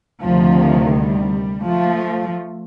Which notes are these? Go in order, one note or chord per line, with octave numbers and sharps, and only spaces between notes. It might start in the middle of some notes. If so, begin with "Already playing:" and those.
D2 C3 D#3 F3
G3
F3 A3